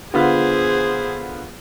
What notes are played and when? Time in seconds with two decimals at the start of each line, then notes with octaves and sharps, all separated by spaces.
0.14 D3 B3 F4 G#4 C5